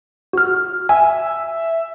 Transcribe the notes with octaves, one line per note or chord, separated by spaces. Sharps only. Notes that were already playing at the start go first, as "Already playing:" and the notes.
F#4 F6
E5 G#5